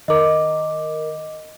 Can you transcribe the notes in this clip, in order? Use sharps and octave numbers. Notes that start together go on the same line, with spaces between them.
D#3 A#4 D#5 D6